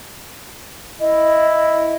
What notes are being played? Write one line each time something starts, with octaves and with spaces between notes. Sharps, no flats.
E4 D#5